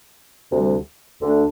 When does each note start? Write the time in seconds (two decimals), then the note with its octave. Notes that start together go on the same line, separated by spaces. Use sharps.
0.52 D2 C3 G3
1.22 D2 D3 A3 D4